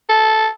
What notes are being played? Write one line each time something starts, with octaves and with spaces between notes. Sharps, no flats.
A4